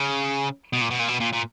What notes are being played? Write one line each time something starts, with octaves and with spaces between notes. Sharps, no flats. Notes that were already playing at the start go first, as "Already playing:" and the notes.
Already playing: C#3
B2
A#2
B2
A#2
B2
A#2
A#2